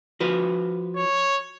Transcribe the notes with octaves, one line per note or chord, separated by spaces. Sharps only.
F3 F#4 B4
C#5